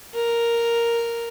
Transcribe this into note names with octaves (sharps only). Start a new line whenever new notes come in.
A#4